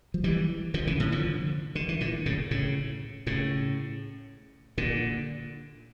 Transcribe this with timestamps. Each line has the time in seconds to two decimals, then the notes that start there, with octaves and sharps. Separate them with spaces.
0.14 F3
0.24 E3 G3
0.74 D3 F3
0.87 C#3 E3
1.00 A2 C#3
1.12 D3 F3
1.75 D3
1.89 E3
2.01 A#2 D3
2.26 A2 C#3
2.51 A2 C#3
3.27 A2 C#3
4.78 A#2 D3